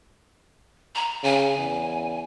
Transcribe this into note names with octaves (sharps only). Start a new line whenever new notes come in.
A#5
C#3 G#5
E2